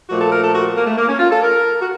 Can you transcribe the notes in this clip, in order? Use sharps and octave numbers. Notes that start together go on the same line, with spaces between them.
A#2 F3 A3 F#4
A4
A#4
A4
F#4
A#3
A3
A#3
C#4
F4
A4
A#4
F#4